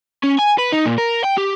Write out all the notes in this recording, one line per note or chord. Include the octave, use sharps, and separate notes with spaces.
C#4
G#5
B4
D#4
A#2
A#4
G5
G4